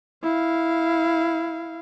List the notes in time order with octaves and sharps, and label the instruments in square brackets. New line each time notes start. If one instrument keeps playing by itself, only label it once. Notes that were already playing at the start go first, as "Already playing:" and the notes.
[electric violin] E4 F5